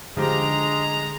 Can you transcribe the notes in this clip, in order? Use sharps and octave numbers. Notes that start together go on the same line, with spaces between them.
D3 F3 G#3 G4 A#5